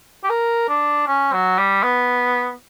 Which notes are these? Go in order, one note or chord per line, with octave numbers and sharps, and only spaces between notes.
G4
A#4
D4
C#4
F#3
G3
B3